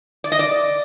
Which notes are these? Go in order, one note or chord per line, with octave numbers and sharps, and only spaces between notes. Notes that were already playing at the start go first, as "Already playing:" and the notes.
D5
D#5
D5